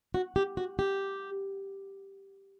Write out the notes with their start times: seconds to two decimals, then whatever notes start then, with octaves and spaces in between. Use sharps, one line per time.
0.14 F#4
0.36 G4
0.57 F#4
0.79 G4